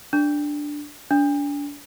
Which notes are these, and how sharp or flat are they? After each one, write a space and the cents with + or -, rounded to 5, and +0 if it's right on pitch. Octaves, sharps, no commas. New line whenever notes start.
D4 +5
D4 -30